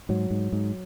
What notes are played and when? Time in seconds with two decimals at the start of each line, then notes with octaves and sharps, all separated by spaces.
0.09 G#2 F#3
0.30 G#2
0.53 G#2